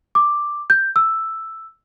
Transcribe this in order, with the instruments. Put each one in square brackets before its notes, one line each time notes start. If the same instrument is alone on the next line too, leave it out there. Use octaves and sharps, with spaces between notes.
[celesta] D6
G6
E6